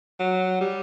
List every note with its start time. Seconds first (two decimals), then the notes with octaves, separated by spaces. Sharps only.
0.20 F#3
0.61 G3